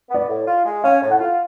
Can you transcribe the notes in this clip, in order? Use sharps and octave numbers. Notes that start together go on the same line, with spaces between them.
B3 D5
A2
F4
G#3
C#4 F5
A2
F#5
F4